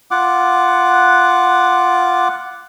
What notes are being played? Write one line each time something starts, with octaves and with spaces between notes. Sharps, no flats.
F4 F#5 D6